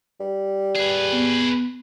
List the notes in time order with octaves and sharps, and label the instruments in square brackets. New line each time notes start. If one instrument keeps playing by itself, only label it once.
[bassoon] G3
[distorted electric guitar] G#4 B4
[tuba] B3